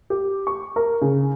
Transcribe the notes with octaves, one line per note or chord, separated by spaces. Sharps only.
G4
C#6
A#4
C#3